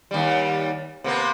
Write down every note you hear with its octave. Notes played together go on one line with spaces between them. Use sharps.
D#2 G3
C3 A#3 B3